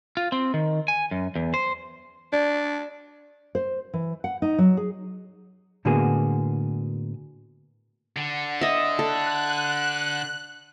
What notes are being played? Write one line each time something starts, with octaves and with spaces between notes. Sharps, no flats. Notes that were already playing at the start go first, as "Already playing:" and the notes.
F4
C4
D#3
G#5
F#2
E2
C5
D4 D5
C5
E3
F#5
D#4
F#3
G#4
A2 D3 A#3 B3 F#4 G#4
D3
D#5 E5
A4 F#6